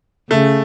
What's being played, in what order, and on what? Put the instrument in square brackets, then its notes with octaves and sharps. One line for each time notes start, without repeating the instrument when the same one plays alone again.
[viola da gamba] C#3 [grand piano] A3